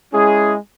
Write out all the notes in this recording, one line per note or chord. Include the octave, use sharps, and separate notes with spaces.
G#3 C#4 E4 G#4